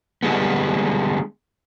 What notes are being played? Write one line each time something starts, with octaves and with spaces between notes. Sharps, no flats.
D3 G3 G#3 B3